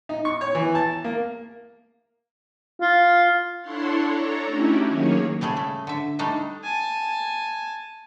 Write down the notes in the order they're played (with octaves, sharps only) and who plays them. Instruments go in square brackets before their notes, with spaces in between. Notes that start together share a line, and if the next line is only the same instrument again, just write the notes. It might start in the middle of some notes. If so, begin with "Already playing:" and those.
[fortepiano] D#4
C#6
C#5
E3
A5
A#3
[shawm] F4
[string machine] D4 E4 A4 C#5 F#5 C6
D4 A4 C#5 A#5
A3 C#4 D#4 E4 F#4 G4
D#3 F#3 A#3 G#4 C#5
[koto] C#3 G3 A3 G#4
A3
D3 E5
G3 A3 D4 D#4
[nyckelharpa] G#5 A5